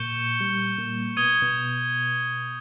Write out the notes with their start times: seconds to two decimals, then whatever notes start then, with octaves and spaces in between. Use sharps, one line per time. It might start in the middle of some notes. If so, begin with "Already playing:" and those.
Already playing: A#2 A#3 C#6 G6 C#7 E7 G7
0.41 G3
0.78 A#2 A#3
1.17 B2 B3 D#6 G#6 D#7 G7
1.42 B2 B3